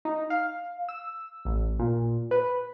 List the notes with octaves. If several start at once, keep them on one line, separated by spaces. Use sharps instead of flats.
D#4
F5
E6
A1
A#2
B4